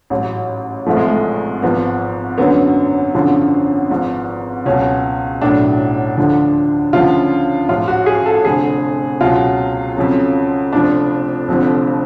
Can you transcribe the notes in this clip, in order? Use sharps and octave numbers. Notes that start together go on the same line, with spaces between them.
A1 G#2 F#3
G#1 G#2 F3 A3
G#3
A3
G#1 G#2 F3 B3
G#1 F#2 D3 F#3 B3
G#1 F#2 D3 F3
G#1 G#2 F3
C#2 B2 F#3 C#4
B1 A2 F#3 D4
D2 D3 F3
D2 C#3 F3 F4
A1 G#2 F3 F4
F#4
G#4
A4
F1 F2 D3 G#4
C#2 B2 F#3 F4
F2 C#3 F#3
F1 F2 F3 D4
F1 F2 D3 F3